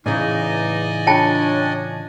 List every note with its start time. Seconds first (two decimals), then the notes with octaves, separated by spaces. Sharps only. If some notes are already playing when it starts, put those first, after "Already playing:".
0.06 E2 A2 C#3 E3 D#4 D5 D#5 G#5
1.07 C#4 D4 F4 G5 A5